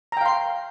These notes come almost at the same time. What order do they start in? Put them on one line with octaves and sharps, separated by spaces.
A#5 G5 F5 C6